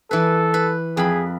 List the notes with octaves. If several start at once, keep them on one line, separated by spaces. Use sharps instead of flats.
E3 A4 B4
B4
F2 G#4 B5